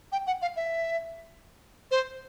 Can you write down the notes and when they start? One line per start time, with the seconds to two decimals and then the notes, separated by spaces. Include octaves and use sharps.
0.12 G5
0.27 F#5
0.42 F5
0.56 E5
1.91 C5